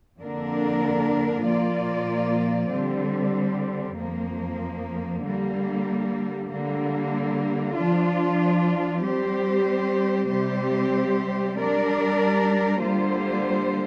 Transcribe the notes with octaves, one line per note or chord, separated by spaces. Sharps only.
F2 D3 A#3 D4 A#4
A#2 F3 A#3 F4 D5
D3 G3 C4
F2 F3 A#3
D3 G3 A#3
D3 G3 A#3
F3 D4 F4
G3 C4 G4 C5
C3 G3 C4 G4 C5
G3 D4 A#4 D5
D3 G3 A#3 F4 C5